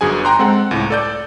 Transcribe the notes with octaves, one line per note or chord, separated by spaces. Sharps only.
G1 F#2 G#4 G#5
G5 A#5 C6 F#6
G#3 C4 A4 F#5
C#2 A2
A4 D5 G6